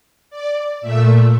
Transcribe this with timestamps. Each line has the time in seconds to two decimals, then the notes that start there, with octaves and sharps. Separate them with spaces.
0.30 D5
0.81 A#2 A3 E5